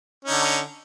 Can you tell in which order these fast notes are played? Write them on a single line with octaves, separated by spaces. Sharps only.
C#4 D#4 D3